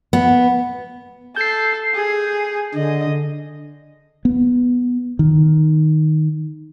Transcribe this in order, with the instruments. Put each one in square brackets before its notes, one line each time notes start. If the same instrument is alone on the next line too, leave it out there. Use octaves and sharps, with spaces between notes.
[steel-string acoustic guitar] B3
[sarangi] A4 [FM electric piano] G6 C7
[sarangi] G#4
[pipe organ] D3 [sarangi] D#5
[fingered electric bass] B3
D#3